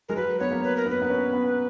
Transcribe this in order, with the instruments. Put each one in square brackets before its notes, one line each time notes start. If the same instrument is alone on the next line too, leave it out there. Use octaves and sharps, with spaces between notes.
[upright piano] G#3 [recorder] A#4
[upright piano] F#3 [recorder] B4
[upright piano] B3 [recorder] C#5
[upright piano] A#3
[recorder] B4
A#4
[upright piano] B3 [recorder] B4
[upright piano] B3
C#4
B3